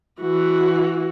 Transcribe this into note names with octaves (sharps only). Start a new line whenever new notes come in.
E3 F#4